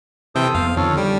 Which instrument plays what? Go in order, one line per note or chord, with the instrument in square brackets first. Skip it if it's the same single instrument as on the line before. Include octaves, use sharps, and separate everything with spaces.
[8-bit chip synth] C3 E3 G5 [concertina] A4 C5 D#6
[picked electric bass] F2 B3 [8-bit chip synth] F5
[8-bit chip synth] F2 [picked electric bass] D3 D#3 [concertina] A4 C#5 F6
[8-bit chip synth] G3 [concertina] G5